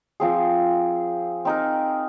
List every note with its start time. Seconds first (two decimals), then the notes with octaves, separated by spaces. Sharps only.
0.20 F3 C4 G#4
1.45 C4 D#4 A#4